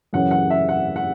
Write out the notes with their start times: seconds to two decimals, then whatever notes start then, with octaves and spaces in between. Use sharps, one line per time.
0.13 F#2 C#3 E3 F#5
0.31 F#5
0.50 E5
0.69 F#5
0.96 F#5